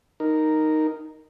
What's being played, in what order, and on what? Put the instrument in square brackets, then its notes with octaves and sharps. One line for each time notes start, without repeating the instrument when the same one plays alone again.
[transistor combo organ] D#4 A#4